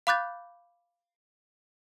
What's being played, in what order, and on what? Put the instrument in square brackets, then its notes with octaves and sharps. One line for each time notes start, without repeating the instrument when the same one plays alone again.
[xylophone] F5 B5 D6 F#6 G6 A6